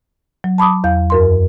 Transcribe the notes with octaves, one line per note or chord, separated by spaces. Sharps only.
F#3
A5 B5 D6 D#6
E2 F5 G6
F#2 A#4 C6